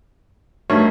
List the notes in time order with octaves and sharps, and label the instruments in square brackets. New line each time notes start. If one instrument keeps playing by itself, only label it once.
[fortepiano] G2 C#5 [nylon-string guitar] A3 B3 D#4 [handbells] F#4 A#4 E5